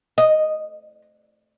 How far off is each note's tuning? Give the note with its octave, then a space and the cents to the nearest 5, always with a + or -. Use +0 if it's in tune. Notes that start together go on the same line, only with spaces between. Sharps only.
D#5 -5